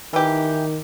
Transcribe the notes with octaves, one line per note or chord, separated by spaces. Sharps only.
D#3 E3 G4